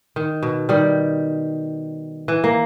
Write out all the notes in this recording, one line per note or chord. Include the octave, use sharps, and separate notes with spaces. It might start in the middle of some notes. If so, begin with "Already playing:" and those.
D#3
B2
D#3 G3
E3
A#3